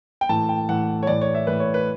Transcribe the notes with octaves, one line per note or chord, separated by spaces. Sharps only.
G5
A2 E3 A5
G5
A2 E3 F#5
C#5
A2 E3 D5
C#5
E5
A2 E3 B4
C#5
B4